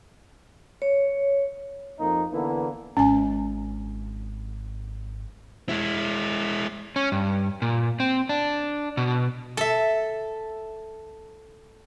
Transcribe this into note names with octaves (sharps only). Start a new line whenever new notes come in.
C#5
F2 A#3 D#4
D3 E3 A#3 B3 E4
G#1 C#4 G#5
G#3 E4
C#4
G2
A#2
C4
D4
B2
A4 E5